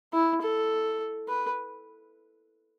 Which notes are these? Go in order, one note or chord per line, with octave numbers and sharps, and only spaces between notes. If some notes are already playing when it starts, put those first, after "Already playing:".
E4
A4
B4